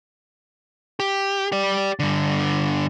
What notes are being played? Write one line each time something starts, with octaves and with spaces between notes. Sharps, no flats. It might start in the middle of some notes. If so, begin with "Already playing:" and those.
G4
G4 D5
G2 D3